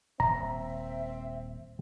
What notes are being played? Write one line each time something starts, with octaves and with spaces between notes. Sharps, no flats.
D#1 C4 E5 A#5